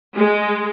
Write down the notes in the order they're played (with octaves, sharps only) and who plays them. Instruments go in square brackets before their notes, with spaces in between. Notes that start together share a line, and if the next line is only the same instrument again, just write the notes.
[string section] G#3